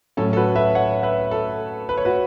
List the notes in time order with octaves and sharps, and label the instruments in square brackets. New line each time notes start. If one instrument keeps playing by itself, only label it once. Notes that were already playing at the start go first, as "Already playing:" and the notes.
[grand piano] A2 F#3 C#4 A4
A4
F#4 B4
B4 E5
C#5 F#5
B4 E5
A4
B4
C#5
F#4 B4